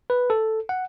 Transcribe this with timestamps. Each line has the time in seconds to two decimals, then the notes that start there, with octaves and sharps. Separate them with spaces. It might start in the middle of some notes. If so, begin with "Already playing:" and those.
0.10 B4
0.30 A4
0.69 F#5